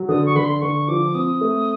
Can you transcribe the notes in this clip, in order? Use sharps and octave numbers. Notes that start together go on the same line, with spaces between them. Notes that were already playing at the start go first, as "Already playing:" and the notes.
Already playing: F#3
D3 D#6
C#6
D3 B5
C6
D3 C#6
F3 D6
C4 D#6
A3